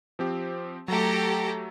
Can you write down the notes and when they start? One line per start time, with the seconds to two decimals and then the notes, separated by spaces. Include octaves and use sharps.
0.19 F3 C4 G4
0.88 F#3 A3 G4 A4 A#5